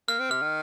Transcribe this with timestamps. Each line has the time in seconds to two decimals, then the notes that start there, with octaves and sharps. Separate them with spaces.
0.08 A#3 F6
0.20 C4
0.31 C3 F6
0.42 D#3